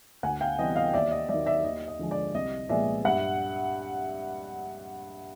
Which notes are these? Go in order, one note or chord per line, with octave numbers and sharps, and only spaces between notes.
D2 F#5 G#5
F5 G5
C3 E3 G3 B3 D#5
D#5 F5
D#2 D5 E5
D#5
D#3 F#3 D5 E5
D5 E5
D#2 D#5
D#5
D3 F3 G#3
D5
C2 D#5
A#2 F3 G#3 B3 D5 E5
G2 E5 F#5